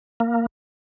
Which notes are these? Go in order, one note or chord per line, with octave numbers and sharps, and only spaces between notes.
A#3